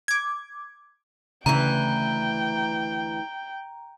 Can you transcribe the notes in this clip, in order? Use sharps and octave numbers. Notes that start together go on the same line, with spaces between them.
D6 G#6
D2 C#3 E3 G5 A#5